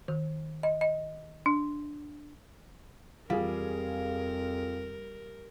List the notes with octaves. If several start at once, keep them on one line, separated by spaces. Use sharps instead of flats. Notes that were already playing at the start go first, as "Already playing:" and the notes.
D#3
D#5
D#5
D4
F2 G3 F4 G#4 A#4